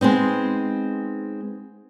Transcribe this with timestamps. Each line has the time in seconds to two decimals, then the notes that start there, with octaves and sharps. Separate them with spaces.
0.01 G#3 B3 C4 D#4